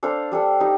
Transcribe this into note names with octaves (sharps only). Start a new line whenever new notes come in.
D4 A4 C5 F5
G3 D4 A4
D#4 G4